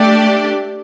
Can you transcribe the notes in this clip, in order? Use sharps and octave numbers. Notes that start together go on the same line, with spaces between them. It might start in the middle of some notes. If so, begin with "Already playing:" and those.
Already playing: A3 D4 G4 D5